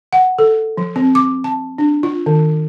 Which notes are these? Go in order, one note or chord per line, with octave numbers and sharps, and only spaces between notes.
F#5
A4
F3
C4
D6
A5
D4
F4
D#3